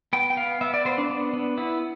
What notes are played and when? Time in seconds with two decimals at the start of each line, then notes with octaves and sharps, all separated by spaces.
0.13 B3 G5
0.30 G5
0.37 B3 F5
0.61 B3 E5
0.74 D5
0.85 B3 C5
0.98 D4
1.10 B3
1.33 B3
1.58 B3 E4